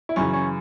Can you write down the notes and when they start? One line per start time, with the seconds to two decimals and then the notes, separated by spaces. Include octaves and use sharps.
0.09 E4
0.16 F#2 C#3 E3 C#4
0.33 C#4